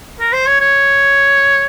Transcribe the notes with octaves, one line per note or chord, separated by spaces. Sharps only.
A#4
C5
C#5
C#5